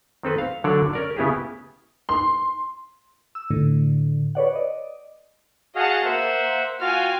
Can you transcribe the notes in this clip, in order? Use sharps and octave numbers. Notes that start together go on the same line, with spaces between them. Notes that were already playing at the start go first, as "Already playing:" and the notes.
D#3 C4 A4 B4
F5
D3 F#3 D4 A4 C#5 D5
C#4 A#4 D5
C#3 B3 E4 G4 G#4
C6
E6
A2 D3
B4 C#5 D5 F#5
D5 D#5
F#4 G#4 D#5 F5 F#5 A5
A#3 C5 E5 F#5
F4 F#4 F5 G5 G#5 F6